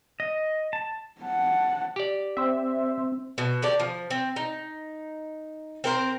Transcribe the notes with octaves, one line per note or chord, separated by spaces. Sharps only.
D#5
A5
F#5 A5
G4 D5
C4 C5 E5
B2
D3 G4 D5
F3
C4
D#4
C4 A#4 C5